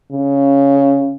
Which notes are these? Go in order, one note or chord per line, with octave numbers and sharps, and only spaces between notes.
C#3